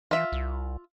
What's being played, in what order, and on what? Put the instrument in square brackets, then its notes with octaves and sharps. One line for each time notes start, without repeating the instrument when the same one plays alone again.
[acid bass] E3 [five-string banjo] F4 E5
[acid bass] C2